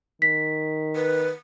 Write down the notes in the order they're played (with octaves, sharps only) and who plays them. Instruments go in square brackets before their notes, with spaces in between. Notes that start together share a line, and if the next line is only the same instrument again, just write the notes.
[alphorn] D#3 [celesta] B6
[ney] B4